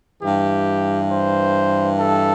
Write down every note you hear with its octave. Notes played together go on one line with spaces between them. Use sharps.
G2 E3 G4
C5
A4